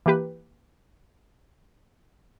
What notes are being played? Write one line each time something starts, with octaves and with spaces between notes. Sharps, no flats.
E3 A#3 G4 B4